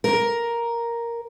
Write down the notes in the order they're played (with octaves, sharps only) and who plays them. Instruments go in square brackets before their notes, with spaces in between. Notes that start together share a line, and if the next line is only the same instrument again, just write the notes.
[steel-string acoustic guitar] A#4